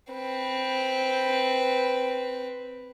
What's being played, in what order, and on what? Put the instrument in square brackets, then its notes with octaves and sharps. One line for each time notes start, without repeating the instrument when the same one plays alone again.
[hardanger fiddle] C4 B4